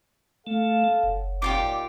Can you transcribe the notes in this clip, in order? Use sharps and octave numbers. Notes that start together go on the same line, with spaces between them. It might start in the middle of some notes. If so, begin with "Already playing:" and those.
A3 A4 F5
F#1
A#2 D#4 F4 G4 D6